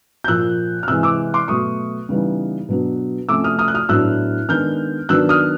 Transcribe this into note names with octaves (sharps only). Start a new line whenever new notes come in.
G6
A#2 F3 A#3 E6 F#6
F6
C3 E3 G#3 E6 F#6
D6 E6
C6 D6
B2 F#3 A3 C#6 D#6
C#3 E3 G3 B3 D#4
B2 F#3 B3 D4
C3 F3 A3 C#4 D6 E6
D#6 F6
D#6 F6
F#6
D#6 F6
A2 F#3 B3 D4 E6 F#6
D#3 G#3 B3 D4 F6 G6
D#3 F#3 B3 D4 E6 F#6
D#6 F6